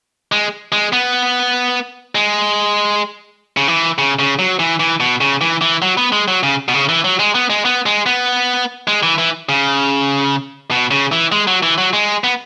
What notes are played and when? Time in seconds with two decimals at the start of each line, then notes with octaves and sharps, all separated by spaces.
0.32 G#3
0.72 G#3
0.93 B3
2.15 G#3
3.57 C#3
3.68 E3
3.98 C#3
4.19 C#3
4.39 F#3
4.60 E3
4.80 E3
5.00 B2
5.21 C#3
5.41 E3
5.61 E3
5.82 F#3
5.97 B3
6.12 G#3
6.28 F#3
6.43 C#3
6.68 B2
6.74 C#3
6.89 E3
7.04 F#3
7.19 G#3
7.35 B3
7.50 G#3
7.65 B3
7.86 G#3
8.06 B3
8.87 G#3
9.03 E3
9.18 E3
9.49 C#3
10.71 B2
10.91 C#3
11.12 E3
11.32 G#3
11.47 F#3
11.63 E3
11.78 F#3
11.93 G#3
12.24 B3